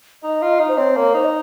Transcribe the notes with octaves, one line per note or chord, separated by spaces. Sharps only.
D#4 D#5
F4
D#4
C5
C4 C#5
A#3 C#5
D#4 C5
D#5